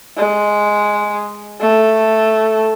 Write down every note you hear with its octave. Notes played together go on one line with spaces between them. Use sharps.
G#3
A3